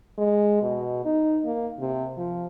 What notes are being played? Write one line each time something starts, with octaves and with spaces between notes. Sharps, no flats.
G#3
B2
D#4
A#3
C3
F3